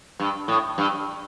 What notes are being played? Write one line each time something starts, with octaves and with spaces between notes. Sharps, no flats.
G2
A2
G2